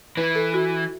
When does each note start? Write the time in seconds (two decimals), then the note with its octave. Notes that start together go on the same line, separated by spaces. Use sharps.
0.17 E3 B4
0.35 A4
0.54 F#4